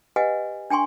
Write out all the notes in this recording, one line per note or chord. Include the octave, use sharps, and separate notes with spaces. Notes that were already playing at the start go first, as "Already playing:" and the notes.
G4 B4 D#5 F#5 G#5
D4 G5 G#5 C6 C#6